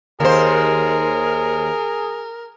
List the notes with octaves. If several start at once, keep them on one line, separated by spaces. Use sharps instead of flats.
D#2 G#4 A#4 C5